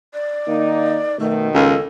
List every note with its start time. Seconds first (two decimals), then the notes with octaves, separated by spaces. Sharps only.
0.14 D5
0.48 D#3 A#3 D#4
1.20 F#2 B2 D#3 A3
1.54 C#2 A4